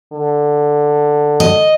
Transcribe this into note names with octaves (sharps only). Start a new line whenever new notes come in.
D3
D#5